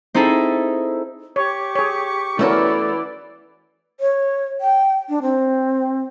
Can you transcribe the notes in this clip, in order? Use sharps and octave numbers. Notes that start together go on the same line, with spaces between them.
C4 D#4 E4 G#4 A4
G4 C#5 C#6 D6
G#4 C#5
E3 A3 B3 C#4 F#4 A4 A#4 D5
C#5
G5
D4
C4